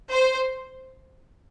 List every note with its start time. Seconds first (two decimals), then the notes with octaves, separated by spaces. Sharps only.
0.11 C5